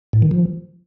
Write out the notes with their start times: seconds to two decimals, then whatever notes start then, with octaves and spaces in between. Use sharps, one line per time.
0.13 A2
0.22 D#3
0.31 F3